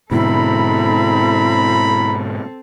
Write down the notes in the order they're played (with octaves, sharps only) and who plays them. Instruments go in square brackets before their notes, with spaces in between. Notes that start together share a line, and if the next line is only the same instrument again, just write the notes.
[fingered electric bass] G#2 B2 D3 [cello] C4 A4 [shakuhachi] E4 [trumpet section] A#5 B5